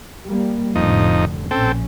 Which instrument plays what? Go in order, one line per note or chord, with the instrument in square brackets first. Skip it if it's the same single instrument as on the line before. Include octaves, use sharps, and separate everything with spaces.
[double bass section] G3 A#3
[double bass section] F1 A2 D3 [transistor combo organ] F2 D#4
[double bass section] A#1 C#4 [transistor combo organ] C4 A4 G5